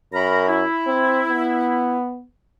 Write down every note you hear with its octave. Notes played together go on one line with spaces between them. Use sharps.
F#2 A#4 A#5 B5
E4
C4
B3